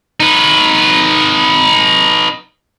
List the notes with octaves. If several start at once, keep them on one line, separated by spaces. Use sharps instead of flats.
D#4 B4